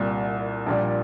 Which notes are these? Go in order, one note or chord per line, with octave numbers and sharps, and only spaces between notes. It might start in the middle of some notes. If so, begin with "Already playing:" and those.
Already playing: C2 A#2 G3
A#1 A#2 G3